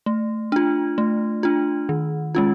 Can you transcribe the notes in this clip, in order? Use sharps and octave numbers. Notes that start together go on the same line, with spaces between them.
A3
D4 F4
A3
D4 F4
D#3
G#3 C#4 F4